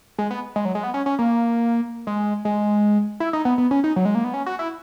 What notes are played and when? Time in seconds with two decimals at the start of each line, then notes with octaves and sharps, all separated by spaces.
0.19 G#3
0.31 B3
0.56 G#3
0.65 F#3
0.75 G#3
0.83 B3
0.94 C#4
1.06 C#4
1.19 A#3
2.07 G#3
2.45 G#3
3.20 E4
3.33 D#4
3.45 B3
3.58 B3
3.71 C#4
3.84 D#4
3.96 F#3
4.05 G#3
4.15 A#3
4.24 B3
4.34 C#4
4.46 F#4
4.59 E4